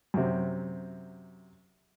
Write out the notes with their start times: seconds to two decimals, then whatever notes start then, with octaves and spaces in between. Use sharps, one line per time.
0.14 F#2 C3